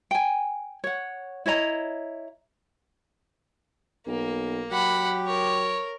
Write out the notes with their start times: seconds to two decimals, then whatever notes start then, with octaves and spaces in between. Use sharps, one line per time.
0.11 G5 G#5
0.84 C#5 F#5
1.46 E4 C#5 D#5 A#5
4.07 B1 A#3
4.71 F#3 G4 F#5 B5
5.27 A#4 C#5